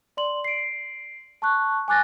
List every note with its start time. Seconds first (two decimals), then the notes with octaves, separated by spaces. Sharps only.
0.17 D5 C6 F#7
0.44 C7 D7
1.42 A5 C#6 F#6
1.88 G#5 D6 F#6 A6 A#6